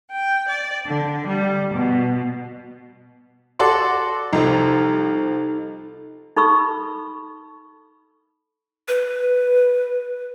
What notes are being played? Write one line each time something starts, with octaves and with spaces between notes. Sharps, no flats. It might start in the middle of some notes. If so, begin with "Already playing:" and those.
G5
D5
D3
G3
B2
F#4 A4 D5 C6
C2 F3 D#4 A4
D#4 A4 B5 C#6 E6
B4